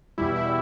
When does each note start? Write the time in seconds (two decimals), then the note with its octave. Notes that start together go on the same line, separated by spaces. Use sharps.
0.18 E2 B2 G3 E4
0.36 E4